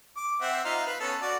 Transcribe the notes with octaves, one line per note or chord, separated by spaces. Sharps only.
D6
C4 E5 F#5
D#4 F4 F5
B4
B3 C#4 A4
F#4 D5